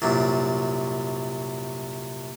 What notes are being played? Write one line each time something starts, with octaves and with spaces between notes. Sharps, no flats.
C2 F#2 A#2